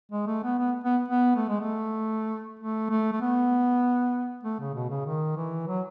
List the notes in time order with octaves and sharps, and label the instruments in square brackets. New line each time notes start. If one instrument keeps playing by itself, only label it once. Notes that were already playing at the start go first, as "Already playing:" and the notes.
[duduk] G#3
A3
B3
B3
B3
B3
A3
G#3
A3
A3
A3
A3
B3
A3
C#3
B2
C#3
D#3
E3
F#3